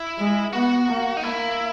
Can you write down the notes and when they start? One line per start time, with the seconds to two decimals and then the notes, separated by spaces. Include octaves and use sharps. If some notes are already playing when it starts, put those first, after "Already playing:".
Already playing: E4
0.18 G#3
0.53 B3 F#4
0.89 A#3
1.17 D#4
1.23 A#3 E4